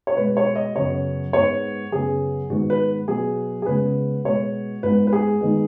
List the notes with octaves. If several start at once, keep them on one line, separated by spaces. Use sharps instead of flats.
C#5
B2 G#3 B3 B4
C#5
D#5
F#2 C#3 B3 C#5
G#2 G#3 B3 C#5
F#2 C#3 B3 G#4
G#2 D#3 B3 F#4
B4
B2 F#3 B3 G#4
G#4
C#3 G#3 B3 B4
B2 G#3 B3 C#5
G#2 G#3 B3 B4
B4
G#4
D#3 G#3 B3